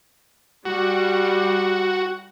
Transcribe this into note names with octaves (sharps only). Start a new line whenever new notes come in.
G3 F#4